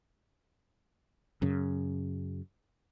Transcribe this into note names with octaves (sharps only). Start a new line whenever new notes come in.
F#2 C#3